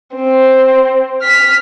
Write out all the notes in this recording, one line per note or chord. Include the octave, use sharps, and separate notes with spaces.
C4
F6 B6